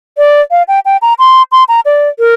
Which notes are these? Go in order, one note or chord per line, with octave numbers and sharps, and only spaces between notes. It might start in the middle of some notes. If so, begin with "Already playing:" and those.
D5
F5
G5
G5
A#5
C6
C6
A#5
D5
A#4